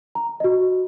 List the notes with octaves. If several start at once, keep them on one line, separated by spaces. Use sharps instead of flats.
A#5
F#4 D#5